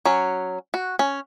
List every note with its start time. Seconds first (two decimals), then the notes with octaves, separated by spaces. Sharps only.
0.05 F#3 C#4
0.74 F#4
0.99 C#4